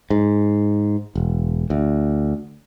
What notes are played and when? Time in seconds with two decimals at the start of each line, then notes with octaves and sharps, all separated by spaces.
0.10 G#2
1.15 E1
1.70 D2